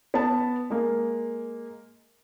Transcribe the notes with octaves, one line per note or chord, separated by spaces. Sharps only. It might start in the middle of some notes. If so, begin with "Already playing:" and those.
B3 A5
G#3 A#3